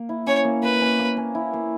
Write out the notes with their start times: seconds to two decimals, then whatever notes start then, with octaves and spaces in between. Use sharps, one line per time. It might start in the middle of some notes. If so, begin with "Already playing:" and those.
Already playing: A#3
0.09 E4
0.27 C#4 C#5
0.44 A#3
0.63 A#3 B4
0.81 C#4
0.99 A#3
1.17 C#4
1.35 E4
1.53 A#3